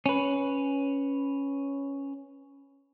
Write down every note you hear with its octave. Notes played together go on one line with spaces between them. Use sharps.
C#4 B4